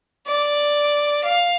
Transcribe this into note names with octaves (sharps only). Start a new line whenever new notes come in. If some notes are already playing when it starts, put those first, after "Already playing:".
D5
F5